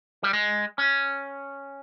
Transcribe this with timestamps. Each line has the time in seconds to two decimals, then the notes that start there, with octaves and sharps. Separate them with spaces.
0.23 G3
0.33 G#3
0.78 C#4